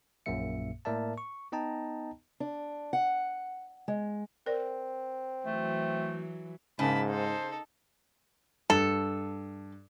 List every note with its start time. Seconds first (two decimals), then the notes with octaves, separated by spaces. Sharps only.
0.26 A#1 F#2 A#2 A#3 E5 C#7
0.85 A2 A#3 A#4 D5 E5 A5
1.18 C#6
1.52 B3 D#4 D#5 G5 A5 A#5
2.40 D4
2.93 F#5
3.88 G#3
4.46 C4 A#4 D5
5.46 E3 F#3 A3
6.79 G#2 C#3 A#3 A5 B5
7.09 D#4 A4 C5
8.70 G2 A4